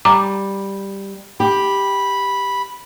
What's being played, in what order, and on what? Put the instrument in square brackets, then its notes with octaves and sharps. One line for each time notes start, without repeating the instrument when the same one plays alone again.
[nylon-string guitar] G3 [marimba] A#5 D6
[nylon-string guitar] G4 [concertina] B5